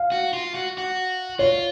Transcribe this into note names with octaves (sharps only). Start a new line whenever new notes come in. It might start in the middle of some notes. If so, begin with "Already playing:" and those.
Already playing: F5
F#4
F4
F#4
F#4
F4 C#5